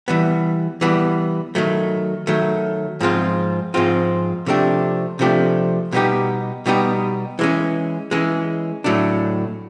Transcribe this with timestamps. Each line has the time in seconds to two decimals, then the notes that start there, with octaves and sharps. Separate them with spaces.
0.08 E3 G3 B3
0.81 E3 G3 B3
1.55 D#3 F#3 A3
2.27 D#3 F#3 A3
3.00 G#2 F3 G#3 C4 F4
3.74 G#2 F3 G#3 C4 F4
4.46 C3 F3 A3 D4 G4
5.19 C3 F3 A3 D4 G4
5.92 B2 G3 B3 D#4 G4
6.66 B2 G3 B3 D#4 G4
7.39 E3 G#3 C#4
8.11 E3 G#3 C#4
8.84 A2 F#3 A3 D4